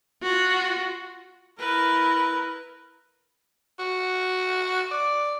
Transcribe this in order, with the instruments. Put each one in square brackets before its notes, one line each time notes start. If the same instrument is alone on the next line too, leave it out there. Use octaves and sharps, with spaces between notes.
[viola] F4 F#4
[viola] E4 A#4 [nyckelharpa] B4
[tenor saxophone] F#4
D5